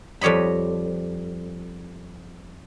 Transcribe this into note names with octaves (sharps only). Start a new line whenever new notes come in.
F2 G3 C#5 D#5 B5